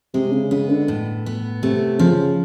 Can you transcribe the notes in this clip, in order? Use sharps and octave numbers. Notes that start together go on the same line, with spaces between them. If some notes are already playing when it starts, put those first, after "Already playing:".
C3 G#3
C#3
C#3 B3
D3
A2
B3
C3 A3
C#3 F3